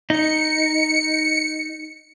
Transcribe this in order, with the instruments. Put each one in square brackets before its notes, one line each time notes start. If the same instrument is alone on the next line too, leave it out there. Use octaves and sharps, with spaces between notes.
[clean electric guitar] D#4 [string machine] C#7